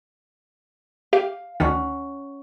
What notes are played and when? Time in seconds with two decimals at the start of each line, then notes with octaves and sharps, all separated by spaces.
1.13 G4 F5
1.60 D2 D#3 C#4 F#5